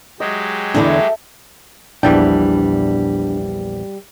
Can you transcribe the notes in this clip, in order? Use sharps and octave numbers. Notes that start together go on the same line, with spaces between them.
F#3 G#3 G4 D#5
E2 D3 D4 E4 A4 E5
A#1 E2 E3 G3 D4 D5 G5